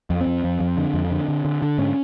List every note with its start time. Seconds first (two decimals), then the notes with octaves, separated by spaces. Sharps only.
0.10 F2
0.21 C4
0.27 F2
0.44 F2
0.60 F2
0.77 D3
0.94 F2
1.11 D3
1.28 D3
1.45 D3
1.62 D3
1.78 G#2 C#4